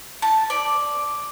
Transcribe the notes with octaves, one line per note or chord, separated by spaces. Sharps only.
A5
D5